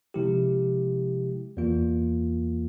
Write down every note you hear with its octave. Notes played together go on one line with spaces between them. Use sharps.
C3 F3 G#3 E4 G4
E2 E3 A#3 F4